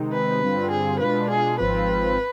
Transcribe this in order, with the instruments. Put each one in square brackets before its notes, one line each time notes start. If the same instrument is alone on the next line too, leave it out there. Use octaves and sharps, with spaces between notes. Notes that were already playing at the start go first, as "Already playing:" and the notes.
Already playing: [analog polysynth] C3 D#3 G#3 C4 D#4
[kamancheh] B4
[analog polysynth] G2 D3 G3 C4 F4
[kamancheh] G#4
[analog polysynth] B2 G#3 D4 F4 [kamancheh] B4
[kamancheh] G#4
[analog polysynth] G#1 G#2 F3 C4 F4 [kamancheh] B4